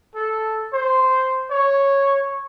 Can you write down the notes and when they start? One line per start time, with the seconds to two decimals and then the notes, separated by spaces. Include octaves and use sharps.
0.15 A4
0.73 C5
1.51 C#5